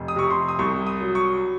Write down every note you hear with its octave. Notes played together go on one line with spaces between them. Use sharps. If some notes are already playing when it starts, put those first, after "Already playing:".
Already playing: F1
D#6
C3 C#6
C6
D#6
C2 C#6
D#6
F#3
C#6